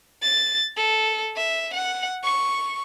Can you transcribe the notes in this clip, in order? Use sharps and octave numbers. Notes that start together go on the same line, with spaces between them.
A6
A4
E5
F#5
C#6